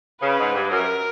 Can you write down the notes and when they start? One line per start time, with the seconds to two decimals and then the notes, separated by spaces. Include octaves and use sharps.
0.22 C#3 B4
0.40 G#2
0.55 G2
0.71 F#2 A#4